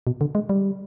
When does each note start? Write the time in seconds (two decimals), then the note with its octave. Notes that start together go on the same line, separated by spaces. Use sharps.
0.07 B2
0.21 D3
0.35 G#3
0.49 G3